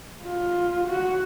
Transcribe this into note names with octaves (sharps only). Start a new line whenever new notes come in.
F4
F#4